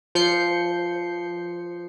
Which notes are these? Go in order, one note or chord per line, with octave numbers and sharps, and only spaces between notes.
F3 G6 C7 C#7